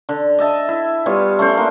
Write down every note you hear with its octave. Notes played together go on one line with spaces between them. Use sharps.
D3
D#5 E5 A5
E4
G3 B3 F4 C#5
A3 C#4 C5
A#3 D4